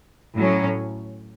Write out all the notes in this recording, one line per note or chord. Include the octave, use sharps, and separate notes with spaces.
A2 F#3 C#4